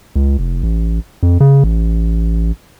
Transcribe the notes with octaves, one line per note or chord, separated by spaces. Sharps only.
C#2
F1
A1
F2
C#3
A1